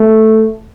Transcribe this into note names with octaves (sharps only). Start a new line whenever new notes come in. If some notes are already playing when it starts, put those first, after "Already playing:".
Already playing: A3